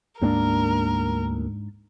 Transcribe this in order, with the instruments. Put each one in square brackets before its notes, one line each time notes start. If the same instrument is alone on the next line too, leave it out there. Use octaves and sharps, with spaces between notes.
[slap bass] D2 A#3 [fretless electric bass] G#2 C4 D4 [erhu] A#4